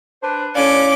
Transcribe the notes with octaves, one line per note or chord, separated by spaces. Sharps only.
D4 B4 C5
A2 C#4 D5 F5 D6